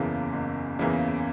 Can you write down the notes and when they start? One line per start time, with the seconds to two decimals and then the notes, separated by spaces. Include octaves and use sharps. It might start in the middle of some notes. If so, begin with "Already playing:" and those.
Already playing: F#1 E2 C#3 E3 A#3
0.33 F#1
0.79 E2 C#3 E3 A#3